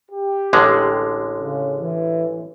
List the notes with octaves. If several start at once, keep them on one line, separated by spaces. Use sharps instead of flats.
G4
A1 D3 G#3
C#3
E3